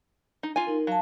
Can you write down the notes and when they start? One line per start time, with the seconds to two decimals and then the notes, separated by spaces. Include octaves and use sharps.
0.43 D#4
0.56 F4 G#5
0.67 D#4 A#4
0.87 F#3 F5 A5